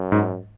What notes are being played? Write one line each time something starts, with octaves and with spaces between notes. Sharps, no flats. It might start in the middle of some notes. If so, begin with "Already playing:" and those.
Already playing: F#2
G#2